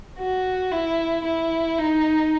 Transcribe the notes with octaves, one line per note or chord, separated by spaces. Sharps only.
F#4
E4
E4
D#4